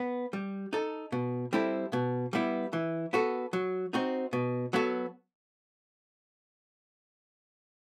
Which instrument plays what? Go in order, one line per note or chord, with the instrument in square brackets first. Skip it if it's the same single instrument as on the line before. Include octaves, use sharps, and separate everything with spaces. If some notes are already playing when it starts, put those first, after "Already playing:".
Already playing: [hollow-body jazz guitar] B3
G3
D#4 A4
B2
G3 C4 E4 A4
B2
G3 B3 E4
E3
B3 F#4 A4
F#3
C4 D#4 F#4
B2
F#3 B3 F#4 A4